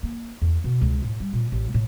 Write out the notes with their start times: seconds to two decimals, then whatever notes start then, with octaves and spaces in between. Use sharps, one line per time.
0.03 A#3
0.42 E2
0.64 B2
0.81 C#2
1.02 A2
1.20 G3
1.33 A#2
1.52 A1
1.74 A2